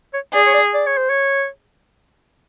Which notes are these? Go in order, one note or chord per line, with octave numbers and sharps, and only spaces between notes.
C#5
G#4 D5
C#5
D5
D5
C#5
C5
C#5